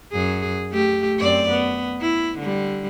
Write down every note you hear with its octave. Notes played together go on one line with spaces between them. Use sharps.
F#2 G#4
A3 G4
F#2 C4 D5
B3
E4
D3 G3